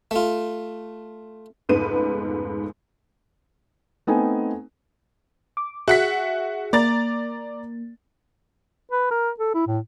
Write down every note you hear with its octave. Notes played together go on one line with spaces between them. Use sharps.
A3 F4
F1 C#2 G#2 B3 B4 D#7
A3 B3 C4 D#4 G#5
D6
F#4 G#4 E5 F#5 B6
A#3 D5 A#5 A6
B4
A#4
A4
E4
A2